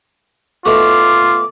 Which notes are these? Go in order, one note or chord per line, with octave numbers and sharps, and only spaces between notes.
B2 A3 F4 F#4 D6